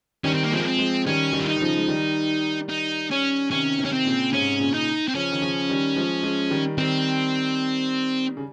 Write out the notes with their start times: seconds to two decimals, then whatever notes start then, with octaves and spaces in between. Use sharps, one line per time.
0.24 D#3 G3 C#4
0.34 C4
0.44 A#3
0.51 F3 G#3 C4
0.61 A#3
0.65 C4
0.78 F3 G#3
1.07 D#3 G3 C#4
1.33 D#3 G3
1.40 F4
1.47 D#4
1.56 D#3
1.61 C#3 F3
1.77 G#3
1.88 D#3 G3
2.69 D#4
3.11 C#4
3.51 C3 D#3 C#4
3.79 C3 D#3
3.84 C#4
3.92 C4
4.05 A#2 C#3
4.33 G#2 C3 C#4
4.60 A#2 C#3
4.74 D#4
5.08 C4
5.15 C#3 F3 C#4
5.32 D#3
5.42 C#3 F3
5.69 D#3 G3
5.96 F3 G#3
6.23 F3 G#3
6.51 D#3 G3
6.77 D#3 G3 C4
8.37 C#3